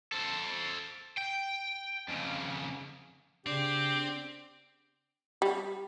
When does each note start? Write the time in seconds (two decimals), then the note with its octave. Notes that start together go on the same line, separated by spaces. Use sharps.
0.12 A4 C5
1.18 G5
2.08 F2 C#3
3.46 C#3 C4 D4 G4
5.42 G3